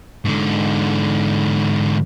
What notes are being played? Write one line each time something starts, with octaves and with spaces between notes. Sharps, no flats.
G#2 D3